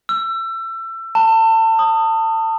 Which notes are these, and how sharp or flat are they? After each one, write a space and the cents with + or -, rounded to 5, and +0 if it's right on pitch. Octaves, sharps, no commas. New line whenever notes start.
E6 +25
A5 +30
D#6 +0